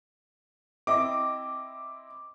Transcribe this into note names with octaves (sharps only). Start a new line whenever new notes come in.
C4 E4 D#5 D6